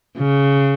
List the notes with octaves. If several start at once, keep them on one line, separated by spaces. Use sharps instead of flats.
C#3